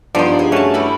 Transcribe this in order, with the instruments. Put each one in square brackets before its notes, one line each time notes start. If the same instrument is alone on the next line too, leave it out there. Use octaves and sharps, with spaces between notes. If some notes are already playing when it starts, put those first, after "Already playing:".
[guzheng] G2 [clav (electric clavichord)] F3 B3 D#4 [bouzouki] C5 D5
[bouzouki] G#4
[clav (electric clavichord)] A3 C#4 F#4 [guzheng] C#5 A5
[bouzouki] G3 E4 B4